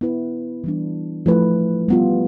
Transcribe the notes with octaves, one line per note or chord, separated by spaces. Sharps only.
B3 E4 B4
E3 G3 D4
F3 A3 E4 B4
G3 B3 F4